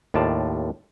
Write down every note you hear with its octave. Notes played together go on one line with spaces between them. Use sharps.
D#2 A2 F4 D5 A5